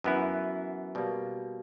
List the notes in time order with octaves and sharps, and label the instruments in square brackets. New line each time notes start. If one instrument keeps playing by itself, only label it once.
[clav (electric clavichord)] F#2 E3 B3 E4
B2 G3 A#3